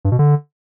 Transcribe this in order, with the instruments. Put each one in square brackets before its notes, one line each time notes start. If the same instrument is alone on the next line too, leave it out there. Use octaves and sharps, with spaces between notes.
[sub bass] G2
B2
D3